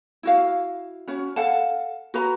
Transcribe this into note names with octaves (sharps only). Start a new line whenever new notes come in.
E4 F#4 F5
C#4 F#4
A4 F5 F#5 A5
F#4 B4 A#5